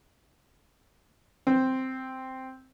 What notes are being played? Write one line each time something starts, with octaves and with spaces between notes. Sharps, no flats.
C4